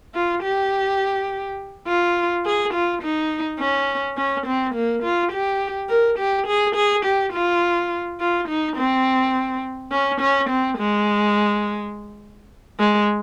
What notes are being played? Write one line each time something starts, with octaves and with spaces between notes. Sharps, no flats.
F4
G4
F4
G#4
F4
D#4
C#4
C#4
C4
A#3
F4
G4
A#4
G4
G#4
G#4
G4
F4
F4
D#4
C4
C#4
C#4
C4
G#3
G#3